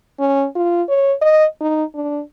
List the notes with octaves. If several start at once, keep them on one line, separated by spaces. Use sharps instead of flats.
C#4
F4
C#5
D#5
D#4
D4